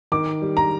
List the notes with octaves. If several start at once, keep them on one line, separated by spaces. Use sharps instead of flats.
D#3 D6
G3
A#5